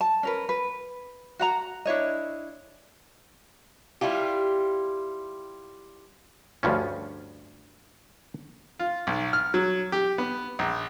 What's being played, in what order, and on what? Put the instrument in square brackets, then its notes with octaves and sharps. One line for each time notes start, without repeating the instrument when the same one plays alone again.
[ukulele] A5
C#4 A#4 B4
B4
F#4 F#5 A#5
D4 E4 C#5 D#5
[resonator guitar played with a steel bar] G3 E4 F4 G4
[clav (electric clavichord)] D2 G2 F3 C#4
[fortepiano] F4
B1
F6
F#3
G4
B3
A#1